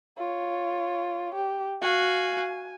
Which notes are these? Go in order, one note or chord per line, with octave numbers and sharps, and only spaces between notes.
F4 C#5
G4
F#4 F5 G#5